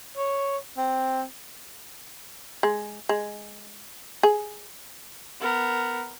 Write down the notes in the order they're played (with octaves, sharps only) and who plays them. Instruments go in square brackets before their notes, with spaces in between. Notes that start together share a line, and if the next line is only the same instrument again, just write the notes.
[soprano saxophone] C#5
C4
[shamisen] G#3
G#3
G#4
[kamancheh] B3 A#4